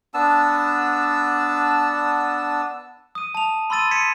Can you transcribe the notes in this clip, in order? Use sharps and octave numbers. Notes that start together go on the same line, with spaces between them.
B3 D4 A5 E6
D#6 D#7
A5 F7
B5 C6 E6 A6 D#7
G#6 B6 C#7 D#7 E7